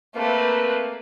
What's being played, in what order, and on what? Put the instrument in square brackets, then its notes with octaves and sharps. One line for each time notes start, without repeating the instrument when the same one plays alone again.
[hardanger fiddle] A3 [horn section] A#3 [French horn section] C4 B4